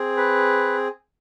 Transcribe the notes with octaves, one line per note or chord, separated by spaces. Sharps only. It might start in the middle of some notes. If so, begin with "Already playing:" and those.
Already playing: C4 G#4
B4